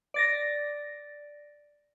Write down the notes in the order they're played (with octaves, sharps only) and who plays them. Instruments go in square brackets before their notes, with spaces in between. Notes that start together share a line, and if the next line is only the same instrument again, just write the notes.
[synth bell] D5 A6 A#6